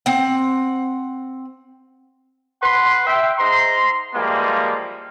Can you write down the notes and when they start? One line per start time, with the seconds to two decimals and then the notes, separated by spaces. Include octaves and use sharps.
0.06 C4 F#5
2.63 B4 F#5 C6
3.07 E5 G5
3.38 G#2 A#5 C6
4.14 E3 F3 G3 G#3 A#3